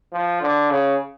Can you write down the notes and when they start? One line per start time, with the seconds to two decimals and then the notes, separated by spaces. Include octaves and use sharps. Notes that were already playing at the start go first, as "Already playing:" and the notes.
0.13 F3
0.41 D3
0.70 C#3